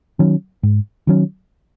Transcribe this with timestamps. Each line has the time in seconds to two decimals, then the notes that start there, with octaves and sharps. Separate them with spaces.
0.19 D#3 F#3 C#4
0.63 G#2
1.07 D#3 F#3 C#4